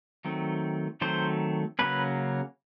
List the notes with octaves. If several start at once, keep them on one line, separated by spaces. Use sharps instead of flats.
D#3 F#3 A3 C4
D#3 F#3 A3 C4 C5
C#3 F#3 A#3 C#4 B4